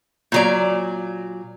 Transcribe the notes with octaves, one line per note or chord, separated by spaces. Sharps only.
A#2 F#3 D5